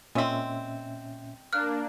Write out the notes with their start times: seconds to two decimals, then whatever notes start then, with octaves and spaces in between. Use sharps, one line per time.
0.15 A#2 G#3 C4 C#4 E5
1.53 A#3 D4 F6 F#6